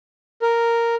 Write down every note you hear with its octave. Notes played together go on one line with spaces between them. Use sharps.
A#4